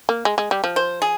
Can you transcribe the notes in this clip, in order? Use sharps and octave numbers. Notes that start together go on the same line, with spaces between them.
A#3
G#3
G#3
G3
F3
C5
G#4